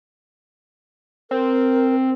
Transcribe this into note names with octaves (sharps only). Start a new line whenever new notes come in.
C4 A#4